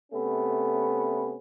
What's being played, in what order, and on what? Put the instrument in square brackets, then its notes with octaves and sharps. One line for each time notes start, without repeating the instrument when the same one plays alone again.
[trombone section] C3 A3 B3 C#4